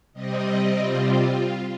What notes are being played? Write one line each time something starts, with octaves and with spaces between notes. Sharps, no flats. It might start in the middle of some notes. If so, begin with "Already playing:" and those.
C3 G3 C4 D#5
F4